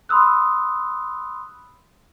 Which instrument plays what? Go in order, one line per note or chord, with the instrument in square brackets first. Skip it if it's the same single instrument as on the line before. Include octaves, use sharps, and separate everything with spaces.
[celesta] B5 C6 D#6 E6 F#6